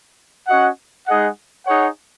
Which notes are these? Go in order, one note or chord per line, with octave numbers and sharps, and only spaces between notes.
C#4 F#4 D#5 F#5
G#3 D#4 G#4 D#5 F#5
D#4 G#4 C#5 F#5